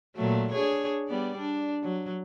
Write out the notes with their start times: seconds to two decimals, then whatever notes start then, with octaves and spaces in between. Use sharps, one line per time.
0.16 A#2 F#3 A3
0.52 D4 G#4 C#5
1.08 G3 B3 D5
1.37 D4
1.83 F#3